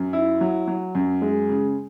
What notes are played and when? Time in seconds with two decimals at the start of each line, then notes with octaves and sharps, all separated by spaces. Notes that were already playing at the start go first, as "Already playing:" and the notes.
Already playing: F#2
0.13 E4
0.41 F#3
0.67 F#3
0.95 F#2
1.22 G#3
1.49 C#3